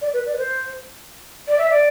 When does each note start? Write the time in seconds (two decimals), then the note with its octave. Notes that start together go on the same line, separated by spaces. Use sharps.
0.01 D5
0.13 B4
0.26 D5
0.33 B4
0.38 C5
1.48 D5
1.58 E5
1.70 D5